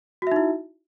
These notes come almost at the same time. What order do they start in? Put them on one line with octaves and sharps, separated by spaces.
F#4 E5 D#4 E4